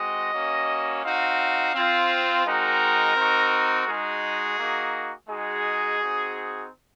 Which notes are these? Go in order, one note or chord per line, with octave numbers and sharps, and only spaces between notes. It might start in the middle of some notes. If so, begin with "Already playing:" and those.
Already playing: G#3 C4 F#4 D#5
A#3 C#4 F#4
C4 D#4 F#4 F5
C4 F4
G#3 C4 D#4 F#4 A#4
C4 D#4 F#4
G#3 D#4 F#4 G#4
A#3 D#4 F#4
G#3 D#4 F#4 G#4
C4 D#4 F#4